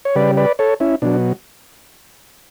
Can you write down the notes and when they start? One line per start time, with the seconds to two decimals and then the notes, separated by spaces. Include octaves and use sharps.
0.05 C#5
0.15 C#3 G3 B4 D5
0.37 B4 D5
0.59 A4 C#5
0.80 C#4 E4
1.02 B2 F#3 D4